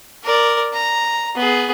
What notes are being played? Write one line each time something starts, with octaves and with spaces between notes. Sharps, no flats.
A#4 D5
A#5
B3 G#4